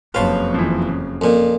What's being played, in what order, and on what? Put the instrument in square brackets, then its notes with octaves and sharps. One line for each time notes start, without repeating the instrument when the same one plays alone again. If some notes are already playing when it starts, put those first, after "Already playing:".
[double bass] F#1 F2 [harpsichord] F4 C6 [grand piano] B4 C#5 A5
[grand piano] E3 F3
C#3
[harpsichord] F2 A#2